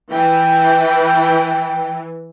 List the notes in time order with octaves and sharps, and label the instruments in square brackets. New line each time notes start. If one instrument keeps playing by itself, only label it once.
[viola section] E3 [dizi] G5